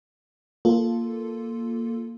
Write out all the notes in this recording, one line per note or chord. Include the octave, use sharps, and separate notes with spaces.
A#3 F4 A4